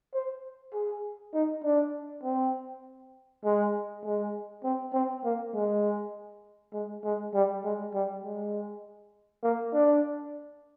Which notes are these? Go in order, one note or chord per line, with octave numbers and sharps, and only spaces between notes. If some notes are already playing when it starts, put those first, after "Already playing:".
C5
G#4
D#4
D4
C4
G#3
G#3
C4
C4
A#3
G#3
G#3
G#3
G3
G#3
G3
G#3
A#3
D4